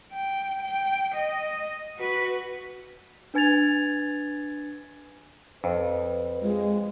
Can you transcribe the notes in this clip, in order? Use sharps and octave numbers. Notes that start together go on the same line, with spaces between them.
G5
G5
D#5
F#4 B4
D4 B4 G#5 G#6 A6 F7
F2 B4
G#3 F4